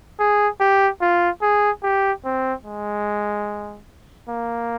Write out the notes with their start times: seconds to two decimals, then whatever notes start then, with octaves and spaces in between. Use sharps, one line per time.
0.20 G#4
0.61 G4
1.01 F4
1.42 G#4
1.83 G4
2.25 C4
2.65 G#3
4.29 A#3